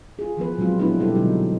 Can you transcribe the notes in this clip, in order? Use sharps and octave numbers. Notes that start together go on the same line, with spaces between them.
F4 G#4
E3 F3 B3 B4
A#2 F#3 G#3 C4 F4
A3 B3 D4 E4 F4 B4
B2 G3 E4 G4 A4 C5
B2 D3 F#3 G#3 D#4